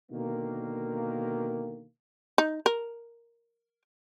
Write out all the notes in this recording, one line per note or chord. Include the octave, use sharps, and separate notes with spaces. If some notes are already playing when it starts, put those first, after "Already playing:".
B2 D3 D#3 A#3
D#4
A#4